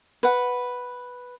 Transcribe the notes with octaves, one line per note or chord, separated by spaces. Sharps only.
B4 F#5